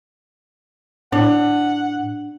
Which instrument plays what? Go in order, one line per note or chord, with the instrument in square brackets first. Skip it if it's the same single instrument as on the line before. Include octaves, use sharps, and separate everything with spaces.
[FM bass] A2 [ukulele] D4 [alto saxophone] F#5